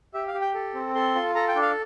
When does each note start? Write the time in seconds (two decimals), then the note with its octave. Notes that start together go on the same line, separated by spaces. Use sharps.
0.14 G4 E5
0.27 F5
0.34 G4
0.41 G5
0.55 A4
0.74 C4
0.95 A4 C6
1.15 F4
1.35 A4 A#5
1.48 G5
1.55 D4
1.62 F5